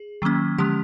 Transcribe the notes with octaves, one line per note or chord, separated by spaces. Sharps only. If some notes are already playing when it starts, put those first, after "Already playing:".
Already playing: G#4
D#3 F#3 A#3 C#4
D3 F3 G#3 C#4 G4